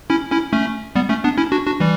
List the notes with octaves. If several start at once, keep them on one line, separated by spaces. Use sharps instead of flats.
C#4 E4
C#4 E4
A3 C#4
G3 B3
A3 C#4
B3 D4
C#4 E4
D4 F#4
D4 F#4
E3 G3